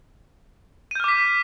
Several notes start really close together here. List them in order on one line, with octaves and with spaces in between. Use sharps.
D#7 G6 F6 D6 B6